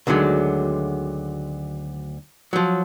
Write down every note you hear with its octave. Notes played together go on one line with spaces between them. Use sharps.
D2 D3 D#3 F#3 G#3
F3 F#3